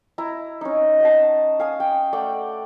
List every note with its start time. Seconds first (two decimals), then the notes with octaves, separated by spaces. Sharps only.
0.18 E4 A#5
0.61 C#4 D#4
1.00 D#5 F#5 A5
1.60 F5 G#5 D#6
1.80 G5
2.13 A3 D5 F#5 G5